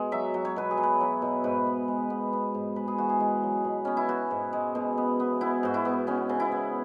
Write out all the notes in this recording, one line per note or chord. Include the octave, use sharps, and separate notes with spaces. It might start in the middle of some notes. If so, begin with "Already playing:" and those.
Already playing: B2 G#3
F#3 E5
F#3
C#5
B2 B4
G#4
F#3
B4
F#3
B2
G#2 B4
B3
G#3
B3
B3
G#2
G#3 B4
G#4
E3 F#4
G#4
G#3
F#3
B2
B3 C#4
E4
B3 F#4
G#2
G#3
B2
B3
B3
B3 E4
G#2 F#4
E4
B3
B3 C#4
C#3
E4
B3